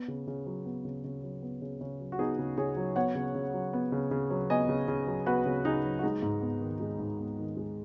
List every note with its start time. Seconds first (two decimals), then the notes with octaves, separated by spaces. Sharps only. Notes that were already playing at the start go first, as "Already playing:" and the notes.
Already playing: B3
0.08 C#3
0.27 C#3
0.46 F#3
0.65 B3
0.85 C#3
1.04 C#3
1.23 F#3
1.42 B3
1.62 C#3
1.81 C#3
2.00 F#3
2.12 F#4
2.19 B3 D#4 G#4
2.39 C#3
2.57 C#3 G#4 C#5
2.77 F#3
2.96 B3 C#5 F#5
3.15 C#3
3.35 C#3
3.54 F#3
3.73 B3
3.92 C#3
4.11 C#3
4.30 F#3
4.50 B3 D#5 G#5
4.69 C#3
4.88 C#3
5.07 F#3
5.26 B3 F#4 B4
5.46 C#3
5.65 C#3 D#4 G#4
5.84 F#3
5.99 F#4
6.03 G#3 D#4
6.22 G#2
6.42 B3
6.61 D#3
6.80 G#3
6.99 G#2
7.19 B3
7.38 D#3
7.57 G#3